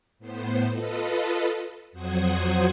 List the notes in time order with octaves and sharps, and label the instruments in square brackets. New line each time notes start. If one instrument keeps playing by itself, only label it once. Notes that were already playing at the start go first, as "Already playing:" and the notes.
[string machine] A2 B3 C5
F4 A4 B4 D#5
F2 F#3 C5 F#5 D#6 G#6